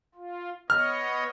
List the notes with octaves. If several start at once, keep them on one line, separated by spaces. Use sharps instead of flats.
F4
B3 C#5 D#5 F6